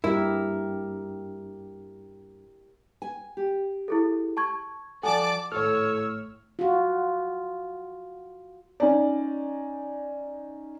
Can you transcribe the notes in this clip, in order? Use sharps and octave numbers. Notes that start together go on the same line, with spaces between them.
G2 E4 G4 A#4
G#5
G4
E4 G#4 A4
A5 C#6 G#6
F3 A4 D5 F#5 G#5 A5 D6
G#1 A2 A4 C#5 E6 F6
F4 F#4
C#4 D#4 D5